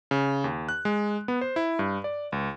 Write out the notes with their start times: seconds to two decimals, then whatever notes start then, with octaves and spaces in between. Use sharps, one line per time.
0.11 C#3
0.44 D#2
0.69 F#6
0.85 G#3
1.28 B3
1.41 C5
1.56 E4
1.79 G2
2.04 D5
2.32 C#2